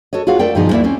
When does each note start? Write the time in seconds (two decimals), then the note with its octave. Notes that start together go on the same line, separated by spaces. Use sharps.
0.13 F#4 A4 C#5 D#5
0.27 F4 F#4 G#4 C#5 F5 F#5
0.39 A3 A4 A#4 D5 G5
0.55 G2 B2 D#3 F3 D#4 G#4
0.70 D2 A#3 E4 D5 E5
0.84 C4 C#4